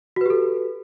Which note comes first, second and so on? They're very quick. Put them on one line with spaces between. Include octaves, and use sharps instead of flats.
F#4 B4 G4 A4